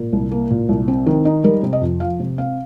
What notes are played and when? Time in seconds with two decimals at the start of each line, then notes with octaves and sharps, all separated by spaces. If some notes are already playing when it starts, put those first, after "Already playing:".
Already playing: A#2 A#4
0.13 C2
0.31 A#3
0.50 A#2
0.69 C2
0.88 C4
1.06 D#3
1.25 D#4
1.44 G3 A#4
1.63 C3
1.73 D#5
1.81 F2
2.00 F3 F5
2.20 C3
2.38 C4 F5